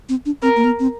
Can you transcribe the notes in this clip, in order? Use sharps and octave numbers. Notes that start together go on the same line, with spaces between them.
C4
D4
C4 A#4
A#3
B3
C4